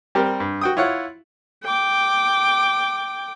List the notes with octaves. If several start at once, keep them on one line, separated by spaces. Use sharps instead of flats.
G3 C4 G4 A#4
G2
F#4 G5 D#6
E4 F4 C#5 F5 F#5
G5 D6